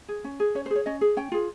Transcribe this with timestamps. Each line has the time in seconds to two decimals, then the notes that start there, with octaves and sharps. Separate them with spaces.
0.08 G#4
0.24 C#4
0.40 G#4
0.55 C#4 C#5
0.66 C5
0.70 G#4
0.76 C#5
0.86 C#4 D#5
1.01 G#4
1.17 C#4 G5
1.32 F4 G#4